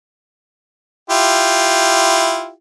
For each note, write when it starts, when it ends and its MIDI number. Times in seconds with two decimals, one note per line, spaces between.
1.10 2.51 64
1.10 2.51 65
1.10 2.51 67